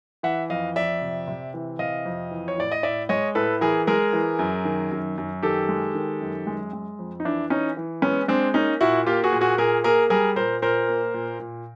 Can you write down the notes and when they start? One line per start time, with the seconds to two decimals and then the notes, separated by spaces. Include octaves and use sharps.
0.23 E3 E5 F#5
0.50 F2 D#5 F5
0.76 F2 D5 E5
1.02 C3
1.28 C3
1.54 E3
1.79 C3 D#5 F5
2.06 F2
2.31 E3
2.48 C#5
2.58 A2 D5
2.72 D#5
2.83 A2 D5 E5
3.09 G#3 C#5 D#5
3.35 A2 A4 B4
3.61 E3 G#4 A#4
3.87 G#3 G#4 A#4
4.13 E3
4.39 F#2
4.65 D#3
4.92 F#2
5.18 F#2
5.43 D#3 G4 A4
5.69 G#3
5.95 D#3
6.21 F#2
6.47 G#3
6.73 G#3
6.99 F2
7.20 D#4
7.25 E3 D4 E4
7.50 E3 C#4 D#4
7.77 E3
8.02 G#3 B3 C#4
8.28 G#3 C4 D4
8.54 A#3 C#4 D#4
8.81 A#2 E4 F#4
9.07 A#3 F4 G4
9.24 F#4 G#4
9.32 A#2
9.41 F#4 G#4
9.58 A#2 G#4 A#4
9.84 A#3 G#4 A#4
10.10 G3 G#4 A#4
10.36 A#2 A#4 C5
10.62 A#2 A#4 C5
10.88 A#3
11.14 A#2
11.40 A#2